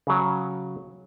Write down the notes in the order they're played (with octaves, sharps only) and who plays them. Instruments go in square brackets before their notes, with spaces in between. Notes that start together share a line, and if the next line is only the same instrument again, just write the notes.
[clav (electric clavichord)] C#3 F#3